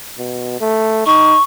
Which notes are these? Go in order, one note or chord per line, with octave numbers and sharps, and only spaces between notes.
B2
A3
D#4 C#6